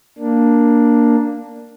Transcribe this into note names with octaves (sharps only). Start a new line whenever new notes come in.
A#3 D4